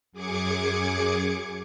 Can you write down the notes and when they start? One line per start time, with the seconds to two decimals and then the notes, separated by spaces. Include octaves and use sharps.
0.12 F#2 G#4 D6 G#6 C#7